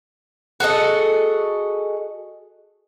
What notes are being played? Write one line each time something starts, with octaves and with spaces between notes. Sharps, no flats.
F#4 G#4 A4 D#5